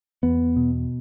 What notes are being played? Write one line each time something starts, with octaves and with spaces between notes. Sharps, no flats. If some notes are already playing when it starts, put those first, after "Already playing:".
E2 B3
B2